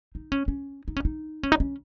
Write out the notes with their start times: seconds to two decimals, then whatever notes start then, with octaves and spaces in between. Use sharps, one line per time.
0.15 D#4
0.32 C#4
0.48 C#4
0.88 D#4
0.96 C#4
1.05 D#4
1.43 C#4
1.52 D#4
1.60 C#4